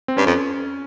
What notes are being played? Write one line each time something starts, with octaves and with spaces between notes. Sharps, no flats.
C4
G2 C#4
F2